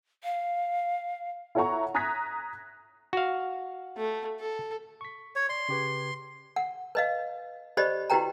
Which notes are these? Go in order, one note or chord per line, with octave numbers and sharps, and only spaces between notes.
F5
E4 A4 C#5 F#5 A#5 C#6
A#5 D#6 F#6 G#6 A#6 B6
F#4 F5
A3
A4
C#6 B6
C#5
D5 C6
C#3 G4 B4
F#5
B4 D#5 F5
G4 C5 D5 D#5 B5
E4 F#4 G4 B4 G5 A#5